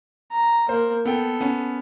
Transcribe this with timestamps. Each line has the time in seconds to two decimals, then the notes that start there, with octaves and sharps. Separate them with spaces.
0.31 A#5
0.69 A#3 C5
1.05 B3 A4 G5
1.41 B3 C#4